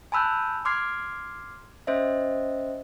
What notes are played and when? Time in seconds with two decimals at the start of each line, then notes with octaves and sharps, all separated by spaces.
0.12 G#5 A5 B5 E6 F#6 G6
0.65 C6 D6 F6 G#6 C7
1.87 C#4 C5 D#5 E5